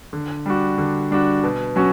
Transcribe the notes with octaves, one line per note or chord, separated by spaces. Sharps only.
D3
G3 D4 F#4
D3
G3 D4 F#4
B2
F#3 C#4 F#4